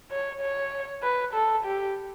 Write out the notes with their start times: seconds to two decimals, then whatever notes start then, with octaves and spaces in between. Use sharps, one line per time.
0.11 C#5
0.41 C#5
1.03 B4
1.34 A4
1.65 G4